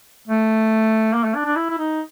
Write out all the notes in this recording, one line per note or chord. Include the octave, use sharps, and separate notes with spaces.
A3
A#3
A3
D4
D4
E4
E4
D#4